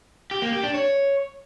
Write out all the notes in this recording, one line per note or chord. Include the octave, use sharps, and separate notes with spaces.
G4
A#3
G4
D4
C#5